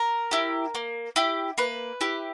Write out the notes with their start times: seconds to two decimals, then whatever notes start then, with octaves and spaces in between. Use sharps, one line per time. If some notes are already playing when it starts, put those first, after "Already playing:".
Already playing: A#4
0.31 E4 G4
0.75 A#3
1.16 E4 G4
1.58 A#3 B4
2.01 E4 G4